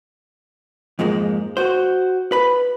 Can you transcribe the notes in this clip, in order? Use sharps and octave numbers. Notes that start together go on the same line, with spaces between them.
F2 G#2 F3 G#3 A#3
F#4 C5
B4 B5